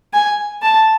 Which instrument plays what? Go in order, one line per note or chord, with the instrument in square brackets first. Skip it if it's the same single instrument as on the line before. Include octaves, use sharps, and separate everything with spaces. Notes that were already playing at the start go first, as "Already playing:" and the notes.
[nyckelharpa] G#5
A5